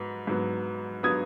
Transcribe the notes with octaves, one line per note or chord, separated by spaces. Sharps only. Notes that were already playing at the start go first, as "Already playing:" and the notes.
Already playing: G#2 F#3 B3
G#2 F#3 B3
F#3 B3 D#6 G#6